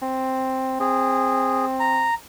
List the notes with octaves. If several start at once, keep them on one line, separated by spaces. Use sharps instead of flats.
C4
C4 G#4
A#5